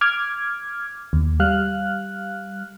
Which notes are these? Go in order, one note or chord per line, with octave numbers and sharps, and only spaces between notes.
D6 F6 G#6
D#2
G3 F5 F6 F#6